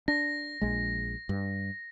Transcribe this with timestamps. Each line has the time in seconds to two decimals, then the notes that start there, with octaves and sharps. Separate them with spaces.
0.08 D4 A#6
0.61 A#1 G#3
1.29 G2